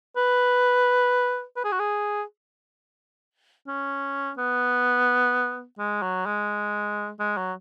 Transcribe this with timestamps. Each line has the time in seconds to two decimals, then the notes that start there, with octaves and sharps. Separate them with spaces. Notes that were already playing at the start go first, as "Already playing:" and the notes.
0.17 B4
1.56 B4
1.64 G#4
1.72 F#4
1.79 G#4
3.68 C#4
4.38 B3
5.79 G#3
6.02 F#3
6.26 G#3
7.19 G#3
7.37 F#3